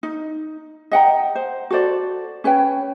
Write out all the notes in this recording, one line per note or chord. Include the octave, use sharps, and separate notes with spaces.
D#4
D#5 F#5 G5 A#5
C5
F#4 A4 C5 D5
C#4 B4 C#5 G5